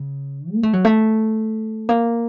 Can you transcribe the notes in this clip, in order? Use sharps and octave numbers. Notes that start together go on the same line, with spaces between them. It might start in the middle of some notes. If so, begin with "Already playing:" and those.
Already playing: C#3
A#3
A3
F#3
A3
A#3